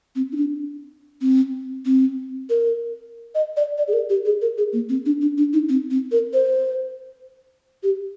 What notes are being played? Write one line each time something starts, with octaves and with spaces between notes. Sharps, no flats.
C4
D#4
D4
C4
C4
A#4
D#5
D5
D5
G#4
A#4
G4
G#4
A#4
G#4
A#3
C4
D4
D4
D4
D#4
C4
C4
A#4
C5
G4